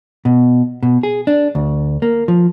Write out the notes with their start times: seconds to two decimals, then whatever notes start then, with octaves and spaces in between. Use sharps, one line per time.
0.25 B2
0.83 B2
1.03 G#4
1.27 D4
1.55 D2
2.02 A#3
2.28 F3